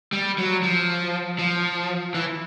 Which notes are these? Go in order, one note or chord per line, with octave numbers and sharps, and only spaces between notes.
G3
F#3
F3
F3
E3